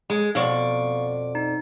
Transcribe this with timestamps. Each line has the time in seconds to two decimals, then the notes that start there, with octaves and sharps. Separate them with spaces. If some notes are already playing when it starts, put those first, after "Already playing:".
0.10 G#3
0.35 F2 B2 D5 F5 C#6
1.35 D#4